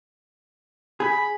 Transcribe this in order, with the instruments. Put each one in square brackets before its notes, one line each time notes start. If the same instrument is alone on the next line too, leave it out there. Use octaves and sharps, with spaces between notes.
[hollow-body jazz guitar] G#4 [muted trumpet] B5